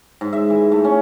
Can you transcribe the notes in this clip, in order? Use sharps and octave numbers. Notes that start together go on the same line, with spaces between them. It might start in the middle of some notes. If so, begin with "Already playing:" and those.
G#2
E5
E3
A3
C#4